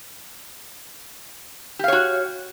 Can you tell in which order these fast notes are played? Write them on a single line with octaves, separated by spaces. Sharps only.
G4 F5 C#5 F#4